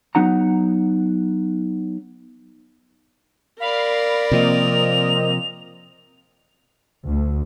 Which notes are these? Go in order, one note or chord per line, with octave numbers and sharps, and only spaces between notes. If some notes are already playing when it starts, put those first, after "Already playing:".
F#3 B3 D#4 F#5 A#5
A#4 D5 F5 B5 C7
C3 F3 A#3 C4 D#5 F7
D2